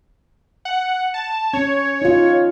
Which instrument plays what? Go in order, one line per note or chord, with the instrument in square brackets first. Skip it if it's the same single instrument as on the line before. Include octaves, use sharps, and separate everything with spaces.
[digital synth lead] F#5
A5
[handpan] C#4 [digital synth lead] C#5
[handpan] D#4 F4